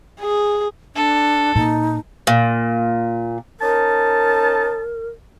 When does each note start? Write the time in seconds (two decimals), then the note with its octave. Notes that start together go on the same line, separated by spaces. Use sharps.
0.21 G#4
0.95 D4 A4
1.55 A#2 D#4
2.27 A#2
3.60 C#4 D#4 A#4 A5